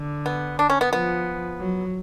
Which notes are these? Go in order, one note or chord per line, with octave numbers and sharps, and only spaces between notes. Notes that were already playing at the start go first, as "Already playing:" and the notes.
Already playing: D3
B3
D4
C#4
B3
F3 B3
F#3